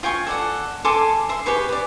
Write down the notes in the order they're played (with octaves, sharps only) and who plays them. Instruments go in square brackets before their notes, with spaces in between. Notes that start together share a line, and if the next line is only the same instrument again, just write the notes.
[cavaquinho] F4 G5 G#5 C#6
A4 D5 F#5
A4 G#5 C6 D6
E5 C6
G4 G#4 B4 C#6
B4 D5